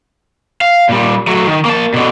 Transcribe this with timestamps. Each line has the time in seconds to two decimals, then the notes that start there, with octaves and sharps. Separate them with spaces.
0.61 F5
0.89 A#2 G3
1.27 F#3 A3
1.47 D#3
1.65 A#3 A5
1.94 B2 D3